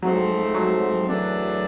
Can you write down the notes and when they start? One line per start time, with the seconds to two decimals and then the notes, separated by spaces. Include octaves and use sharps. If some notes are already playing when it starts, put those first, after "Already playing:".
0.02 G#2 F3 F#3 A3 C4
0.55 F#3
1.06 F#2 C#3 E3 A3 D4